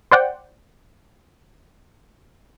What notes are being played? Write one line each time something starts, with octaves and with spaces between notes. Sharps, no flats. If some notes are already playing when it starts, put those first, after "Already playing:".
C5 D5 F#5 G5